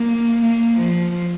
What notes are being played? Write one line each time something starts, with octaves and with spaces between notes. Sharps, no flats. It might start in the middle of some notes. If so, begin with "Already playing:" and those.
Already playing: A#3
A#3
F3